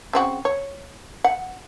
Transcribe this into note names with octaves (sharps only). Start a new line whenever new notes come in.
C#3 C4 F#4
C#5
F#5